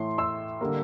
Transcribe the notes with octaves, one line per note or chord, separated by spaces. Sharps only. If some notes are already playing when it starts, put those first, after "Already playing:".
Already playing: A2 E3 A3 E4 C6
C6 E6
D3 G3 A#3